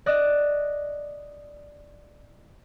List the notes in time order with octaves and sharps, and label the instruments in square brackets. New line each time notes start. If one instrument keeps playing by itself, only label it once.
[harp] D5 D#5 F#6